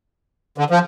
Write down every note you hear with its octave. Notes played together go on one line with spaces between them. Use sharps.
D3
F3